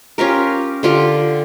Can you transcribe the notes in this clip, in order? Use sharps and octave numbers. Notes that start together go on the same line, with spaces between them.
C#4 F4 G4 A#4
D3 F4 G4